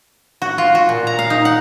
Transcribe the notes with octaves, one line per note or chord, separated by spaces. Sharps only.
F#4
F4
F#4
A#2
A#5
F5
D#4
F#5